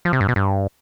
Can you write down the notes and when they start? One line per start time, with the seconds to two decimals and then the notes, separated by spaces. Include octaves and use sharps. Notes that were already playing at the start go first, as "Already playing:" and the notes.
0.05 F3
0.13 C3
0.21 G2
0.28 B2
0.36 G2